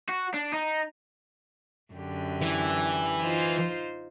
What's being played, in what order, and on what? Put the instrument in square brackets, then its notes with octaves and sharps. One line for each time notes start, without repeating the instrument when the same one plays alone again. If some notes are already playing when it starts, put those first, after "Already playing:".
[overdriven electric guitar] F#4
D4
D#4
[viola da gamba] F#2 D3 G4
[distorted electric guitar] E3
[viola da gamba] D#4 F4 C5